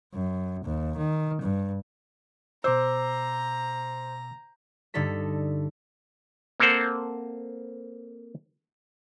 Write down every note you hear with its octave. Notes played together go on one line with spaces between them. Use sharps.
F#2
D#2
D#3
G2
B2 C5 A#5 D6 E6
G2 D3 D#4 A4 B6
A#3 C4 A4 A#4 C5 F#5